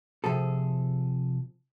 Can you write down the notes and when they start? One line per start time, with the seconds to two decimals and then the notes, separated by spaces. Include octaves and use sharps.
0.24 C3 F3 G#4 A4